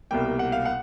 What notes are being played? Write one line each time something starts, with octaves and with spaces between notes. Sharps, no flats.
C2 B2 G3 A#3 G5
F#5
F5
F#5